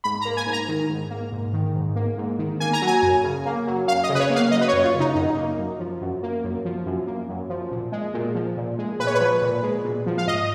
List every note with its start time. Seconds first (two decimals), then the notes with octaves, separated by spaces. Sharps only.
0.04 G#2 B5
0.21 A#5
0.25 A#3
0.37 G#5
0.46 G#2
0.53 A#5
0.68 D#3
0.89 G#2
1.10 A#3
1.32 G#2
1.53 D#3
1.75 G#2
1.96 A#3
2.18 G#2
2.39 D#3
2.60 A#3 G#5
2.73 A#5
2.82 F#3
2.87 G#5
3.03 F#2
3.24 C#3
3.46 A#3
3.67 F#3
3.87 F#2 F5
4.04 D#5
4.09 C#3
4.15 B4
4.20 C#5
4.30 A#3
4.36 F5
4.51 F#3 D#5
4.61 B4
4.68 C#5
4.73 F#2
4.84 F4
4.95 C#3
5.00 D#4
5.15 F#2 D#4
5.37 A#3
5.58 F#2
5.80 F3
6.01 F#2
6.23 A#3
6.44 F#2
6.65 F3
6.86 F#2
7.07 A#3
7.29 F#2
7.50 F3
7.72 A#2
7.92 G#3
8.14 A#2
8.35 F3
8.57 A#2
8.79 G#3
8.99 A#2 B4
9.07 C#5
9.15 B4
9.20 F3
9.42 A#2
9.63 G#3
9.85 A#2
10.06 F3
10.18 F5
10.27 G#2 D#5